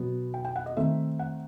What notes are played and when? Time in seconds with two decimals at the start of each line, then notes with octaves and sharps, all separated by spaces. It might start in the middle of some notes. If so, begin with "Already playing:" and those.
Already playing: B2 F#3 B3
0.34 G5
0.45 G5
0.56 F#5
0.66 D#5
0.77 D#3 A3 C4 E5
1.19 F#5